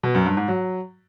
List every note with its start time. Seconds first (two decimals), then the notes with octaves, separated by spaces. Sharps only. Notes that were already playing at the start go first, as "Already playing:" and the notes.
0.03 B2
0.15 F#2
0.26 G2
0.37 G#2
0.48 F#3